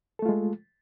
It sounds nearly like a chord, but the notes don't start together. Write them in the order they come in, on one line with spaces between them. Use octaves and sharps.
A4 A3 F4 G#3